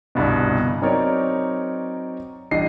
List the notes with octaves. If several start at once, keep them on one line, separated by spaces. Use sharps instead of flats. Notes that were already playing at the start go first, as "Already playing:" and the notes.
G1 C2 G2 B2
F#3 C4 D#4 A#4 C#5 D5
A1 G3 D4 D#5 C7